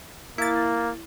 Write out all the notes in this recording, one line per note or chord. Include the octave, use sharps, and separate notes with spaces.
A#3 E4 A6